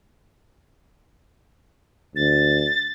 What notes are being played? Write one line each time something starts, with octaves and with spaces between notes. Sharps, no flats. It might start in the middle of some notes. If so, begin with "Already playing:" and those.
D2 A6